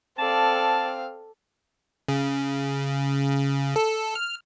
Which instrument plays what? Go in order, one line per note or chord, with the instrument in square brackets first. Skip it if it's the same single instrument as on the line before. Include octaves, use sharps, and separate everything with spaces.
[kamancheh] C4 F5 [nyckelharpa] A4 D5 [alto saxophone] A5
[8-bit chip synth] C#3
A4
F6